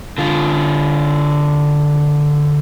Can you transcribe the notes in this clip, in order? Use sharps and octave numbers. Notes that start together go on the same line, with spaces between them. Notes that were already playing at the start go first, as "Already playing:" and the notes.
D3 F4